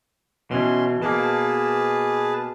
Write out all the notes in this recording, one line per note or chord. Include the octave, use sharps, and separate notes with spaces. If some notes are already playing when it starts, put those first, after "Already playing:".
B2 E3 C#4 C6
B2 A#3 G#4 B4 A5